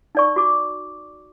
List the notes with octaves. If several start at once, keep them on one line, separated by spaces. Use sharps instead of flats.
D#4 D5 C#6
F#4 D6